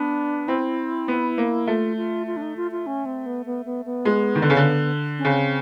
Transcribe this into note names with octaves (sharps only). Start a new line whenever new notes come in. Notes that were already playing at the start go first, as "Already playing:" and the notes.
Already playing: B3 D4
C4 E4
B3
A#3
A3 F4
F4
F4
D4
D#4
F4
F4
C#4
C4
B3
B3
B3
B3
G#3
D#3
D3
C#3
D3
C#4
C#3 C4